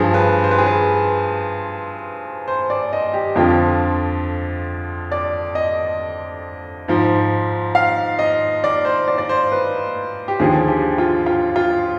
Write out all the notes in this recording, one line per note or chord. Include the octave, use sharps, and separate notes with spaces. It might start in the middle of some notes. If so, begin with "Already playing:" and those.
Already playing: G2 F3 G#4
B4
C5
B4
G#4
B4
C5
D5
D#5
G4
F2 D3 F3 F4
D5
D#5
G#2 F3
F5
D#5
D5
C5
D5
D5
C5
B4
G4
D#2 D3 F3 G#4
G4
F4
F4
F4